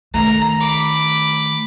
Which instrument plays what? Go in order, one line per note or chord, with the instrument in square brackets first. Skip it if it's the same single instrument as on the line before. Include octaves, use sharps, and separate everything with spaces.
[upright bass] D#3 A3 [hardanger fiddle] A#5
[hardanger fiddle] B5 D6